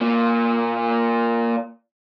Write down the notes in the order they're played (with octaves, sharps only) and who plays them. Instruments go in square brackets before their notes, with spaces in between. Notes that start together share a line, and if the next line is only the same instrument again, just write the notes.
[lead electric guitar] A#2 A#3